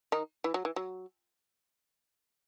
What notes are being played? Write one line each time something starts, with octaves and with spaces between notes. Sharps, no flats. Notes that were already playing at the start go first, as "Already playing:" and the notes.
D#3 D#4
E3
F#3
E3
F#3